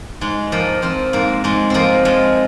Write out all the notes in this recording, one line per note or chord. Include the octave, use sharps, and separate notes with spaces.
G#2 G#3
F3 A#3
F3 C4
G#2 A#3
G#2 G#3
F3 A#3 C4
F3 G#3